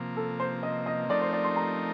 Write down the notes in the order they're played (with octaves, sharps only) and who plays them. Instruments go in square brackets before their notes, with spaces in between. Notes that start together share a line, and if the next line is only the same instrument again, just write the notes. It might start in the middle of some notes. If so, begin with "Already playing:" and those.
Already playing: [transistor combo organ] C3 F3 A#3
[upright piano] A4
C5
D#5
D#5
[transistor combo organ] F3 A3 C4 D#4 A#4 [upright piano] D5
[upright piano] C5
D5
C6
A#5